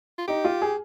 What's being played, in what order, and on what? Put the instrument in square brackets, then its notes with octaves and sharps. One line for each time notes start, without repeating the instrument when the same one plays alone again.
[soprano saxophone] F4
[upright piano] D#4 [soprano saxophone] G4
[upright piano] F4
G#4